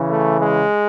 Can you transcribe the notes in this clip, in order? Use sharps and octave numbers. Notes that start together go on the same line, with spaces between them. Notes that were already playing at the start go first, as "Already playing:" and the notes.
Already playing: C#3 E3
A3
G#3